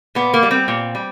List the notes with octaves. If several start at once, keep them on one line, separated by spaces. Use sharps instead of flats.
A#2 B3
A#3
G3
C4
A#2
G3